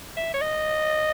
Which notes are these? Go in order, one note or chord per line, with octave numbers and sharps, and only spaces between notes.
E5
C#5
D#5